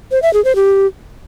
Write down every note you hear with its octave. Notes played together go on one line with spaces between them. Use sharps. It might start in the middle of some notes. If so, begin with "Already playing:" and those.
C5
E5
G#4
C5
G4